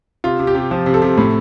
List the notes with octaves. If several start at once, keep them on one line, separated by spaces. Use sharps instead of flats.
C3 F4
C3
G4
C3
F3
C3
A4
C3
A2